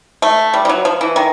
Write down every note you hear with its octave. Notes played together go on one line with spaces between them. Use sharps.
A3
G3
G3
F#3
F3
E3
D#3